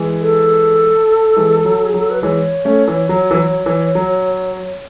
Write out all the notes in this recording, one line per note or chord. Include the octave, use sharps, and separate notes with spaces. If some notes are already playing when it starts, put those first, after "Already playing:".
Already playing: E3 G#3
A4
E3 G#3
F#3
G#4
F#3 A4
B4
E3 G#3 C#5
A3 C#4
E3
F#3
E3
F#3
E3
F#3